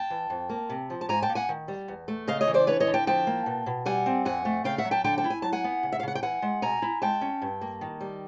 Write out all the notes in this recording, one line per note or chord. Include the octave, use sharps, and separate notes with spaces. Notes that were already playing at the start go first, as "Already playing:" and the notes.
Already playing: G5 A5
E3
F2
A#3
C3
F3
A5
G#2 G#5 A#5
G5 A5
A#3
F#5 G#5
D#3
G3
E2
A3
C#3 D#5 F5
C#5 D#5
E3
C5 D5
D3 B4 C#5
C#5 D#5
D3
G5 A5
F3 G5 A5
A#3
B2
B2
G3 F#5 G#5
C4
F2 F#5 G#5
A3
C#3 F5 G5
E5 F#5
F#3
G5 A5
D3 G5 A5
G5 A5
E4
G#5
F#3 A5
F#5 G#5
B3
C#3
E5
F5
C#3 F#5
G5
E3 F#5 G#5
G#3
B2 G#5 A#5
E4
G#3 G5 A5
C#4
G2
A#3
D#3
G3